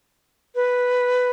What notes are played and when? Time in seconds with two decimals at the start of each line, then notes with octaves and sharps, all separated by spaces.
0.55 B4